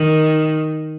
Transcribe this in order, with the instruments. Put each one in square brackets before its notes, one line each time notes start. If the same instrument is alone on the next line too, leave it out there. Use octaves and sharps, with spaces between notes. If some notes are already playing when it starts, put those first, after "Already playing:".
Already playing: [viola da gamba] D#3